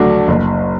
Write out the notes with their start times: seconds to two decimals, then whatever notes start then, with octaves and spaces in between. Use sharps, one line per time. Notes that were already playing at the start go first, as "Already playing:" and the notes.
Already playing: D2 D3 F#3 A3 D4
0.28 F#1